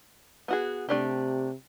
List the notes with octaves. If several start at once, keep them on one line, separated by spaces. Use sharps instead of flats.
B3 F#4 G#4
C3 A3 D4 G4